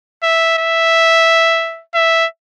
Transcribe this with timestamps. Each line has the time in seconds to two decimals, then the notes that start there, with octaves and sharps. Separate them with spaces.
0.23 E5
0.58 E5
1.95 E5